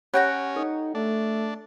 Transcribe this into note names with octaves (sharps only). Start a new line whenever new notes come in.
C#4 G4 C#5 F#5 G5 A#5 B5
D#4 A4
A3 D4